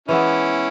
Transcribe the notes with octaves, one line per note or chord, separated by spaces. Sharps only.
E3 G#3 B3 C#4 E4